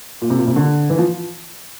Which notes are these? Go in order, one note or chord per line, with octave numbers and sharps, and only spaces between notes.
A#2
C3
A#2
C3
D3
E3
F3